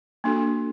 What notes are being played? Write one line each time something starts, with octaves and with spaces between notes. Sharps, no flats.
A#3 D4 F#4 A4